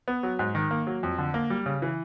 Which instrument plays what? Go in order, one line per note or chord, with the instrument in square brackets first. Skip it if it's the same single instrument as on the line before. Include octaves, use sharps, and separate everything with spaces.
[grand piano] B3
F#3
G#2
D#3
A#3
F#3
F2
D3
A#3
G3
C#3
E3